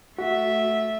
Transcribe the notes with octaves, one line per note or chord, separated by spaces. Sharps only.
A3 F#4 E5